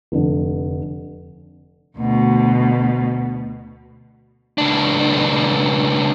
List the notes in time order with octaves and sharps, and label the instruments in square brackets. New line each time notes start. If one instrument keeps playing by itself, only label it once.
[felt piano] F1 D3
[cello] D2 B2
[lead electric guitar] C#2 D4